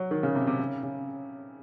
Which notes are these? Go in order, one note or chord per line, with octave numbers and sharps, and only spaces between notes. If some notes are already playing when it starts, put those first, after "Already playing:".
Already playing: F#3
D#3
C#3
C3
C3
C#3
C#3